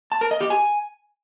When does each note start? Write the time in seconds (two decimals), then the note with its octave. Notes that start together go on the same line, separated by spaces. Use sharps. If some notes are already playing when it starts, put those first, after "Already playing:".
0.12 A5
0.21 A#4
0.31 D#5
0.41 G4
0.50 G#5